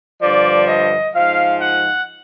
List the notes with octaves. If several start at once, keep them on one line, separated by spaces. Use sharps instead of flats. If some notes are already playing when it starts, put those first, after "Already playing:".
G2 D3 F3 D5
D#5
G#2 F3 F5
F#5